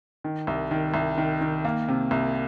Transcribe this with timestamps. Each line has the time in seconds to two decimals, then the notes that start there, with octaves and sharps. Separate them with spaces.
0.24 D#3
0.47 C2
0.71 D#3
0.94 C2
1.17 D#3
1.41 D#3
1.65 A#3
1.88 C3
2.11 C2